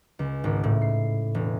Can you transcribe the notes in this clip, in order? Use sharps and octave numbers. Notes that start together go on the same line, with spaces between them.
C#2
G#1
A2
C7
E1